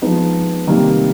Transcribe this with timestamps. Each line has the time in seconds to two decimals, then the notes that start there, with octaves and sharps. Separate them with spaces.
0.02 F3 G#3 B3 D#4
0.67 C3 D#3 G3 A#3